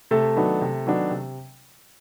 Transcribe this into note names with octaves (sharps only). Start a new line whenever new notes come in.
C3 A3 A4
D#3 F#3 B3 D4
C3
D#3 F#3 B3 D4
C3